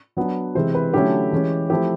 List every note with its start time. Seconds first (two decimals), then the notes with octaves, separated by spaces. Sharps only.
0.17 F#3 B3 D4
0.55 C3 E3 G#3 C4 C5
0.75 B4
0.93 D3 F#3 A3 C#4 E4 G4
1.33 E3 G#3 C#4
1.70 F3 A3 C4 E4 G4